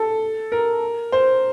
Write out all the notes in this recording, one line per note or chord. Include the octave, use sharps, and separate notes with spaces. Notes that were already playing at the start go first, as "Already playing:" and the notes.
Already playing: A4
A#4
C5